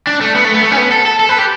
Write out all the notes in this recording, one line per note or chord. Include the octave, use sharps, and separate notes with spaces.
D4
A3
B3
A3
B3
A3
C#4
B3
A4
A4
A4
B4
G4